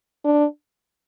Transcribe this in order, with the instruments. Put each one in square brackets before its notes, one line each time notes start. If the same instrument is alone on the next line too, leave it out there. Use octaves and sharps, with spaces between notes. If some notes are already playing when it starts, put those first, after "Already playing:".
[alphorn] D4